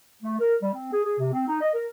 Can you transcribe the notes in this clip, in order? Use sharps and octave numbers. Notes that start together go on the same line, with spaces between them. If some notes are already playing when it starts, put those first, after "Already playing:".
A3
A#4
G3
C4
G#4
G#4
C3
C4
D#4
D#5
A#4